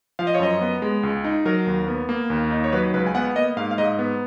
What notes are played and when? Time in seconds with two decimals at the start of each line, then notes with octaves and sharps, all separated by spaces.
0.19 F3 F5
0.27 D#5
0.35 C#5
0.40 F#2 D#5
0.61 B3
0.82 G#3
1.03 C#2
1.24 D#4
1.45 F#3 A#4
1.66 D#2
1.88 B3
2.09 A#3
2.30 D#2
2.51 D#4
2.64 C#5
2.72 F#3 B4
2.94 C#2 B4
3.07 G#5
3.15 B3 F#5
3.35 A#3 D#5
3.57 G#2 F5
3.71 F5
3.78 G#2 D#5
3.99 B3